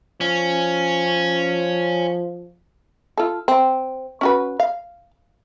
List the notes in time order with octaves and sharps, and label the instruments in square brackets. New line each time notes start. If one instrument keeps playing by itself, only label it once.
[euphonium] F3 [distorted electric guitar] C#4
[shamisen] F4 A4
C4
C#4 F#4 B4
F5